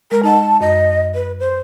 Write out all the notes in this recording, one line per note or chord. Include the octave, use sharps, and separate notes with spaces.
G#3 A#4
D#4 D#5 F#5 A5
F#2 D#5
B4
C5